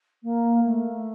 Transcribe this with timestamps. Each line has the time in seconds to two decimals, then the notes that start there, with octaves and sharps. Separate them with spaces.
0.23 A#3
0.65 A3